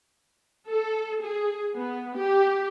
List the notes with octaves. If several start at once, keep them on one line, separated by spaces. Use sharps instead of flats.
A4
G#4
B3
G4